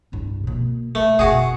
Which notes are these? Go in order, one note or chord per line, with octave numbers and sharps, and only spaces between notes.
C2 G2
B2 A#3
A3 A#3
F#1 B2 F#4 G#4